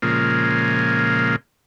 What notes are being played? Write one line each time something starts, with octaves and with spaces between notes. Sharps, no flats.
A#2 C#3 F3 G#3 A#3